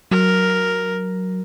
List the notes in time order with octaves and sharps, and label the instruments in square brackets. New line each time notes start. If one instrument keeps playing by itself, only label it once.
[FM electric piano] F#3 [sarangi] A#4